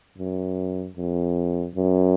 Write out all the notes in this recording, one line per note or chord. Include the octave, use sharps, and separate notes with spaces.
F#2
F2
F#2